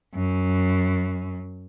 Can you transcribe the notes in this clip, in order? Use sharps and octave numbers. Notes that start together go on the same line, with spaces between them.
F#2